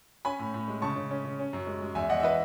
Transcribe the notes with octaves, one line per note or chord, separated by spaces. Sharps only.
C#4 G#5 B5
A2
A2
G#3
C#3 A5 C#6
C#3
C#4
C#3
C#4
F#2
G#3
G#3
E2 E5 G#5
E2 D#5 F#5
E5
E3 B4 D#5